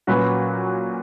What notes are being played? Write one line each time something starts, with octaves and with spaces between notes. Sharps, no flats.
A#2 F#3 C#4 F#4 B4